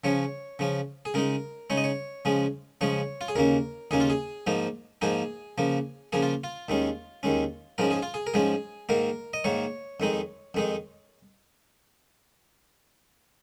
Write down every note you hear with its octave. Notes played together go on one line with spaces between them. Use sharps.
C#3 F3 C#4 C#5
C#3 F3 C#4
G#4
C#3 G#3 D#4 A#4
C#3 G#3 D#4 C#5
D#5
C#5
C#3 F3 G#3 C#4
C#3 F3 G#3 C#4 C#5
F4
G#4
D#2 C#3 A#3 C#4 A#4
D#2 C#3 A#3 C#4 G#4
F4
G#4
G#2 F3 A#3 D#4
G#2 F3 A#3 D#4 G#4
C#3 F3 A#3
C#3 F3 A#3 G#4
F4
F4
D#2 D#3 G#3 C#4
D#2 D#3 G#3 C#4
G#2 F3 G#3 C#4 A#4
G#4
F4
G#4
A#4
G#2 F3 G#3 C#4 G#4
G#2 D#3 A#3 A#4
D#5
G#2 D#3 A#3 C#5
F2 D#3 G#3 D#4
F2 D#3 G#3 D#4